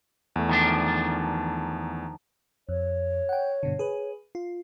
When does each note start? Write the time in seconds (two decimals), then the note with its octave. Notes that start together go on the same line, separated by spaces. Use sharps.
0.36 E2 A3
0.49 D#3 F3 D4
2.69 F2 C#5
3.29 F#5 G5
3.63 G2 B2 D3
3.79 G#4 B4
4.35 F4